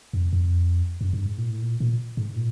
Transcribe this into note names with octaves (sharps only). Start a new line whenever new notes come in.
F2
F2
F#2
G2
G#2
A#2
A2
A#2
A#2
G#2
A#2